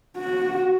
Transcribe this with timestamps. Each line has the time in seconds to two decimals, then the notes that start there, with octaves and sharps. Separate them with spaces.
0.17 F#4